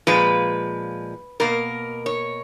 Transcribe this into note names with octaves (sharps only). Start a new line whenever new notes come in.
A#2 F3 G#3 B4
B2 A#3 A#4
C#5